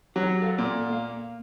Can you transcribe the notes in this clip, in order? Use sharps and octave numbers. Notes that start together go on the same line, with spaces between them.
F#3 G4 C#5
A4 F5 F#5
A#2
A#3 F5